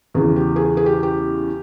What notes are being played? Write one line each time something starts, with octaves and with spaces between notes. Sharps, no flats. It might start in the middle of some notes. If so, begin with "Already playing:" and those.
E2 C#3 E3 G#4
G4
G#4
G#4
G4
G4